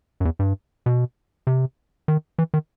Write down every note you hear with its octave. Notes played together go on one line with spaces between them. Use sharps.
F#2
E2
G2
B2
C3
D#3
E3
D#3